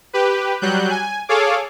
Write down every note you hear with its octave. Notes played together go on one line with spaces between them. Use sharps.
G4 B4
F#3 G3 F#6 G6
G#5
G#4 A4 C#5 F5 D6